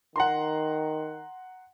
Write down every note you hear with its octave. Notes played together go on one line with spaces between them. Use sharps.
D#3 F#5 A#5 C6